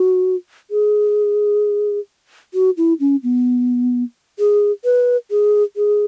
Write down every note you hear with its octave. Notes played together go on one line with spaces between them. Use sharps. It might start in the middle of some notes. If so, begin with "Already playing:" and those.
Already playing: F#4
G#4
F#4
E4
C#4
B3
G#4
B4
G#4
G#4